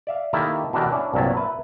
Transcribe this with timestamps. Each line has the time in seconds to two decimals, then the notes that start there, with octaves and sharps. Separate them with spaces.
0.07 D5 E5 F5
0.33 D#3 A#3 E4 G4 A4
0.73 B2 D3 E3 D4 G4 A#4
0.91 C#4 D4 E4
1.14 C2 G2 A#2 F#3 E4 A5
1.35 A#4 B4 E5